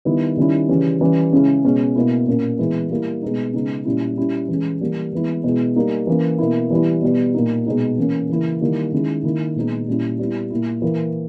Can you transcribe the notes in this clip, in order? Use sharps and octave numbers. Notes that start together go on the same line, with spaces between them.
D#3 G3 B3 E4
D#3 G3 C#4 E4
C#3 E3 G3 C#4
E3 G3 C#4
C#3 G#3 C#4 E4
B2 G#3 C#4
B2 A#3 E4
A#2 A#3 C#4
E3 G#3 B3 E4
G3 A#3 E4
B2 G#3 B3 D#4
C#3 G#3 B3 D#4
A#2 G3 C#4 E4
G3 C#4 E4
E3 G#3 C#4
E3 G3 A#3
E3 G#3 B3 E4
B2 G#3 B3 E4
G3 A#3 D#4
E3 A#3 C#4
B2 A#3 E4
E3 G3 B3 E4
B2 G3 B3
A#2 A#3 D#4
B2 G#3 D#4
E3 A#3 C#4
C#3 E3 A#3 E4
D#3 G3 A#3 E4
D#3 G#3 C#4 E4
D#3 A#3 E4
A#2 G#3 B3 D#4
A#2 G3 C#4 E4
G3 B3 E4
A#2 A#3 E4
E3 A#3 E4